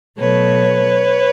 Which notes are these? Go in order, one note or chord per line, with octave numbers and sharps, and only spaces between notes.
B2 F#3 A3 B4 C#5